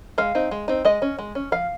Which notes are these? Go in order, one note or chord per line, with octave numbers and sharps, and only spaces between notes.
G#3 F5
C4 D#4
G#3
C4 D#4
G#3 D#5
C#4
G#3
C#4
F3 F5